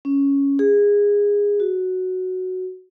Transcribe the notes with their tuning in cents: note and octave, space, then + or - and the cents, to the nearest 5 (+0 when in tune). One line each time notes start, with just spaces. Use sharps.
C#4 +5
G#4 -20
F#4 +0